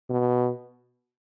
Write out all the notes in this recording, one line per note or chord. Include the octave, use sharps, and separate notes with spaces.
B2